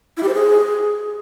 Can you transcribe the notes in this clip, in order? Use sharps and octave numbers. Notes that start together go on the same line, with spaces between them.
E4
G4
C5
G#4